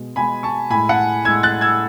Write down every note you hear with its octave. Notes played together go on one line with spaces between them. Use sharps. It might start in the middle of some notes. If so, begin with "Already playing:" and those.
Already playing: B2 G#3
B2 G#3 G#5 B5
A5 C#6
A2 G#3 G#5 B5
F#5 A5
A2 G#3 E6 G#6
F#6 A6
E6 G#6